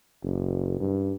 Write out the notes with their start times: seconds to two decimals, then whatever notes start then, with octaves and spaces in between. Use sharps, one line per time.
0.23 F#1
0.80 G2